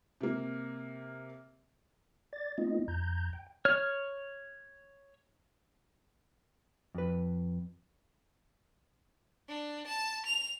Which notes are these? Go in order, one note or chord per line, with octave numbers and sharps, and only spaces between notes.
C3 A#3
D5 A6
A3 B3 C4 D#4 F4 D#5
F2 A#5 G6
G5
C#5 F6
F2 B4
D4
A5
F7